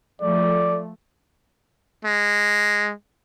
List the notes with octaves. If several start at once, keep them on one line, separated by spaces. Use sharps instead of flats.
F3 A3 D5
G#3